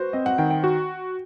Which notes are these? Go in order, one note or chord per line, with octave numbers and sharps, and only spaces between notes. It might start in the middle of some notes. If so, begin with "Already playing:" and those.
Already playing: F#4 B4 C5
C4 D#5
F#5
D#3 G5
G5
F#4